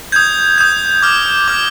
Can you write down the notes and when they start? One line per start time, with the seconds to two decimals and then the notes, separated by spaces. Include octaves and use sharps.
0.12 D#6 G6 G#6
0.58 D#6 G6
1.03 D6 F6
1.48 D6 F6